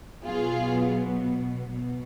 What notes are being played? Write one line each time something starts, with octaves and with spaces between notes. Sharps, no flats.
B2 F#3 B3 F4 G#4
B2